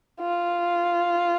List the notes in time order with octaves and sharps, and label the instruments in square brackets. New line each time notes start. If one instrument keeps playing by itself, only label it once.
[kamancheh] F4